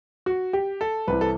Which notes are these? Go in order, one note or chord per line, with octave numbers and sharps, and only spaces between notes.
F#4
G4
A4
C2 C3 E3 B4
A4